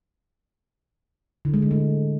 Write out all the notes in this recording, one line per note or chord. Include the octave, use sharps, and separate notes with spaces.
D3
G#3
D3
A3